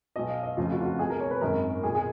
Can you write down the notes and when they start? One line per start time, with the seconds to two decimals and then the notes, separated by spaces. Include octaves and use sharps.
0.16 B1 B2 D#5
0.29 F5
0.43 D#5
0.57 F1 F2 C#3 F4
0.72 F#4
0.81 F4
0.85 F#4
0.99 B1 B2 G#4
1.10 A#4
1.20 C#5
1.31 B4
1.41 G#1 F#2 D#3 A#4
1.83 B1 G#4
1.87 A#2
1.95 G#4